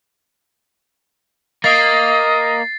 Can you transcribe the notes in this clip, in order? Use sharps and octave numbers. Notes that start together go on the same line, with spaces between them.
A#3 D#5 A6 C7